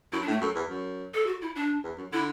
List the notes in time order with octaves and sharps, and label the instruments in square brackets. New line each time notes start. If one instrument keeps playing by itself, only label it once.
[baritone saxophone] F#2 [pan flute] E4
[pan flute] D4
[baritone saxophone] A2
[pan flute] A3
[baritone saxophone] F#2 [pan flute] A4
[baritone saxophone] E2
F#2
[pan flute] A4
F#4
E4
D4
[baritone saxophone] E2
F#2
[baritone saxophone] D3 [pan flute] E4